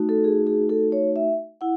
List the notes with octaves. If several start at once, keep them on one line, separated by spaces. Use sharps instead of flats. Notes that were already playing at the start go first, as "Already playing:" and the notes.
Already playing: A3 D#4 F#4
A4
G#4
G#4
A4
C#5
E5
E4 F#5